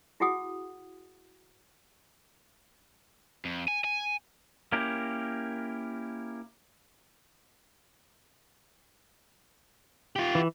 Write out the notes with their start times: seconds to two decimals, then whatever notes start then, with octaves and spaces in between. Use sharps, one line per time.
0.20 E4 F#4 G#4 F#5 D#6
3.45 F2
3.68 G#5
3.84 G#5
4.72 A#3 C#4 E4 G4 A#4
10.16 F4 G4
10.35 E3